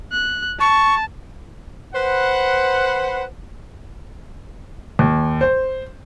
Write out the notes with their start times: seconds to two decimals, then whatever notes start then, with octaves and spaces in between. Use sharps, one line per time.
0.13 F#6
0.60 A5 C#6
1.94 B4 C5 F#5
4.99 D#2
5.41 C5